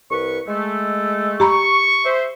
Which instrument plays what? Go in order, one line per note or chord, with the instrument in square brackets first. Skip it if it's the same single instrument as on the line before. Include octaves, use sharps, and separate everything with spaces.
[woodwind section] C2 B4 C#6
G#3 A3
[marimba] G4 A#5 B5 [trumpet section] C#6
[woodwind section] C5 E5